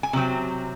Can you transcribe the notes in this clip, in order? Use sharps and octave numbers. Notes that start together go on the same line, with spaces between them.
G#5
C3 F#3 C4